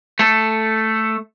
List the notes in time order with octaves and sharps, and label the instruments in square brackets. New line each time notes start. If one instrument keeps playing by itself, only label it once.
[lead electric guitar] A3 A4